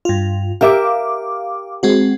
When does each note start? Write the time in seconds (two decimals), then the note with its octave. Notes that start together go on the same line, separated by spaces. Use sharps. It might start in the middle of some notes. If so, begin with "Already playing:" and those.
0.05 G2 F4
0.61 G4 A#4 E5 F5 D6
1.83 G#3 C4 F#4